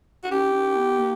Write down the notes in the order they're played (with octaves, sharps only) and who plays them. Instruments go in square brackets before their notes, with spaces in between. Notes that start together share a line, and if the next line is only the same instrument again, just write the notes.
[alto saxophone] F#4
[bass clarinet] C#4 [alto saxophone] G4
[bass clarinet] C#4
B3
A#3